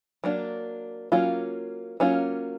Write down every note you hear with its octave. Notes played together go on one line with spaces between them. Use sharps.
F#3 A#3 D4
F#3 A#3 C#4 F4
F#3 A#3 C#4 F4